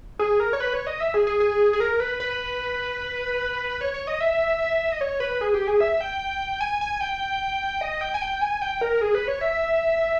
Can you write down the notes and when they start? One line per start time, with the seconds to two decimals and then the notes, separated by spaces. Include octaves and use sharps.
0.19 G#4
0.40 A#4
0.53 C#5
0.60 B4
0.73 C#5
0.87 D#5
1.00 E5
1.14 G#4
1.27 G#4
1.40 G#4
1.73 G#4
1.80 A#4
2.00 B4
2.20 B4
3.81 C#5
3.94 C#5
4.07 D#5
4.20 E5
4.92 D#5
5.01 C#5
5.20 B4
5.41 G#4
5.54 G4
5.67 G#4
5.80 E5
6.01 G5
6.61 G#5
6.81 G#5
7.01 G5
7.81 D#5
8.01 G5
8.14 G#5
8.21 G5
8.41 G#5
8.62 G5
8.81 A#4
9.01 G#4
9.15 B4
9.28 C#5
9.41 E5